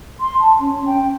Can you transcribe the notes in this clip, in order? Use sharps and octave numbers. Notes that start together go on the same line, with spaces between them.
C6
A5
C#4
G5